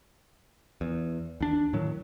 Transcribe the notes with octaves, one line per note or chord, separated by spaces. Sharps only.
E2
D#2 D4
A2 D#3 F#3